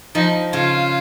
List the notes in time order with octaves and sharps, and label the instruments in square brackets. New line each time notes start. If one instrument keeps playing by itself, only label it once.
[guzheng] F3 [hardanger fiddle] D#4
[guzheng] C#3 [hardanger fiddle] F4